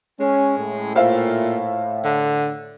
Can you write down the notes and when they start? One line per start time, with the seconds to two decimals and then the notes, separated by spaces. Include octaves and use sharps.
0.20 G#3 C#4
0.58 A2
0.95 A#2 C5 E5 F5
2.04 D3